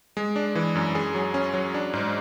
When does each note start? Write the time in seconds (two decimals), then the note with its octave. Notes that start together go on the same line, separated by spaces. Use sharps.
0.17 G#3
0.36 D4
0.55 E3
0.75 F#2
0.95 G#4
1.15 F#3
1.34 C#4
1.54 F#3
1.74 D4
1.93 G#2